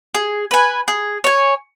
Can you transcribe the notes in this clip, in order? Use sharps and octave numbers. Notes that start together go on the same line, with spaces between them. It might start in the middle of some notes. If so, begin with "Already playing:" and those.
G#4
B4 G#5
G#4
C#5 G#5